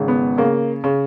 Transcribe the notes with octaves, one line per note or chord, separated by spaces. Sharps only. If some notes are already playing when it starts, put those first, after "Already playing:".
Already playing: G#1 C#3
B3
C#3 A#3
C#3